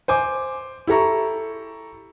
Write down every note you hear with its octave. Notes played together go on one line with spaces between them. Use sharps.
C5 G#5 D6
E4 G4 A4 A#5 C#6